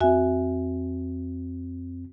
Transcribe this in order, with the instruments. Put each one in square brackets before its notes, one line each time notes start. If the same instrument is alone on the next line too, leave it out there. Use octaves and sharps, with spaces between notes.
[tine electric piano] F2 C4 [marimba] F#4 E5 G#5